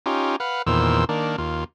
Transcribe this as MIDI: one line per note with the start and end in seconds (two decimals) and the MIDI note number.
0.06 0.36 61
0.06 0.36 63
0.06 0.36 65
0.06 0.36 67
0.40 0.62 71
0.40 0.62 77
0.40 0.62 78
0.67 1.05 40
0.67 1.05 46
0.67 1.05 51
0.67 1.05 72
0.67 1.05 88
1.09 1.36 51
1.09 1.36 58
1.09 1.36 62
1.38 1.64 39
1.38 1.64 65